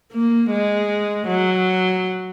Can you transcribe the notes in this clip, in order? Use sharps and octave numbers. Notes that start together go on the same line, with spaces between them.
A#3
G#3
F#3